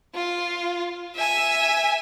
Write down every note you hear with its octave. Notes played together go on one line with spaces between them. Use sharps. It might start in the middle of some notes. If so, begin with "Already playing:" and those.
F4
E5 G#5